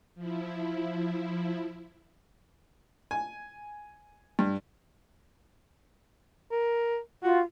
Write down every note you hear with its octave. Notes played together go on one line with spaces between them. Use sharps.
F3 E4
G#5
G2
A#4
F4 F#4